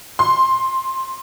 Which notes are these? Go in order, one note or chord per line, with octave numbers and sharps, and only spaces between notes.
C6